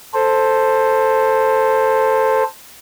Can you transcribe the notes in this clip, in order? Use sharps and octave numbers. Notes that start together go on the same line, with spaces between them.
A4 C5